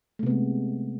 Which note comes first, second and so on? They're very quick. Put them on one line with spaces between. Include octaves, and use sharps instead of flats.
A3 C3 B3 G#3